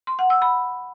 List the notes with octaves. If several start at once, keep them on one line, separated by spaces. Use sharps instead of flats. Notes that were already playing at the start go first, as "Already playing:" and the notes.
C6
F#5
E6
B5